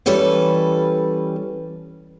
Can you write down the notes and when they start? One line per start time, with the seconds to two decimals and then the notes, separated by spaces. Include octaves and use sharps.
0.06 E3 G3 C#4 A4 B4 D5